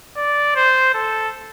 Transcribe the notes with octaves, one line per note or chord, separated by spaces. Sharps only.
D5
C5
A4